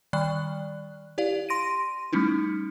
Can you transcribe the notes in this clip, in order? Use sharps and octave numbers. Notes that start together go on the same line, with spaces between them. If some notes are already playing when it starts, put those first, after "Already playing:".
D#3 G3 D5 F#6
E4 G4 D5 F5
C6 A#6 D7 D#7
G3 A3 C#4 D#4 E4